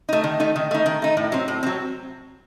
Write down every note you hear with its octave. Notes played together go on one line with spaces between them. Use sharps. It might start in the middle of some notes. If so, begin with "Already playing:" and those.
A3 D#4
D#3
A3 D#4
D#3
A3 D#4
D#3
A3 D#4
A2
F#3 C4
A2
F#3 C4